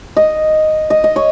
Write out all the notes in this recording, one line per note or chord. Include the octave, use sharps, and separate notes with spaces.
D#5
D#5
D#5
C#5